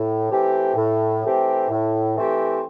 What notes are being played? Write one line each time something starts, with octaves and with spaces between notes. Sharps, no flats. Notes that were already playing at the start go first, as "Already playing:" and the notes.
Already playing: A2
E3 A3 C4 G4
A2
E3 A3 C4 G4
A2
E3 A3 C4 G4